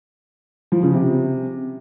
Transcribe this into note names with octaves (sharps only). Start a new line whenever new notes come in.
F3
C#3
C3